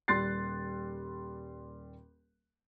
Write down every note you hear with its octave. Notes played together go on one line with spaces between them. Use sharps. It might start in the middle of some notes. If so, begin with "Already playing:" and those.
D#1 G3 C6 F#6 A6 C7